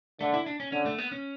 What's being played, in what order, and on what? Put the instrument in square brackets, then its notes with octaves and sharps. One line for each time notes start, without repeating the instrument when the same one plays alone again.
[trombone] D3 [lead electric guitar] A3
[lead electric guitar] E4
D4
C#4
[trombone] D3 [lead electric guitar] C#4
[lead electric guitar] A3
B3
C#4